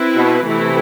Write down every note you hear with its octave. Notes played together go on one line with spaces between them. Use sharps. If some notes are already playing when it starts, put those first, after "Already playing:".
Already playing: C4 E4 B4
B2
C3 E3 A3 E4